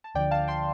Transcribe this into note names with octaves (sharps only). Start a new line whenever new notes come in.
A5
D2 D3 F3 D5 G5
F5 A5
G5 C6